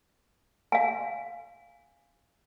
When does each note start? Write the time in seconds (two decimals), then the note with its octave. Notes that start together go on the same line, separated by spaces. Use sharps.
0.72 F5 G#5